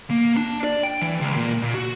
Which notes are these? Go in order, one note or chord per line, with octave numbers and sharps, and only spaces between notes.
A#3
D4
D5
G5
E3
C#2
A#2
A#2
F#4